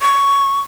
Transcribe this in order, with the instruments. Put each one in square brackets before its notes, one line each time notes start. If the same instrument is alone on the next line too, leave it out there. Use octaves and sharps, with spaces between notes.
[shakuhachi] C#6